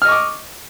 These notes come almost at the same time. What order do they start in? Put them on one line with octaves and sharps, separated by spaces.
F6 D#5 C#6 D6